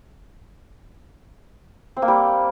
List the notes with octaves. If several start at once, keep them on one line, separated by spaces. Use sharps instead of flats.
C4
A#3
G3